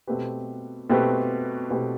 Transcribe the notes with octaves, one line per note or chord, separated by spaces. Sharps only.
B2 A3 C4 G4 B4
B2 A3 C4 G4 B4
B2 A3 C4 G4 B4